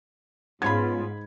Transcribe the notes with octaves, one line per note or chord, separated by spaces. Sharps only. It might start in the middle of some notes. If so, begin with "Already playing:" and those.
G#2 B3 C#4 F4 B5 G#6